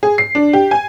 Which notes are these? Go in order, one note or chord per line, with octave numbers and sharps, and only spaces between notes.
G#4
C7
D4
G4
G#5